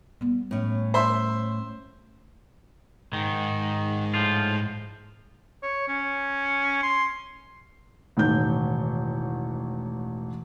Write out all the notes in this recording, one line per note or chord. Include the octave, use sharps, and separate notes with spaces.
G3 B3
A2 C#4
C5 E5 C6
G#2 D#3
A2 F3 F4
C#5
C#4
C6
E1 A1 D#3 G6